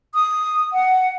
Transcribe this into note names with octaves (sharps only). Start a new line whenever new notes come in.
D#6
F#5